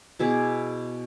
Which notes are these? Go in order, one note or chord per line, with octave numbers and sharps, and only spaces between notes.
B2 E4 G#4 D5